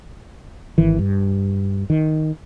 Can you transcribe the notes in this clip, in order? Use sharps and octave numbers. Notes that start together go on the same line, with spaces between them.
G#1 D#3 E3
G2
D#3